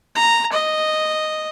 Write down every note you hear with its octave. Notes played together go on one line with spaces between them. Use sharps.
A#5
D#5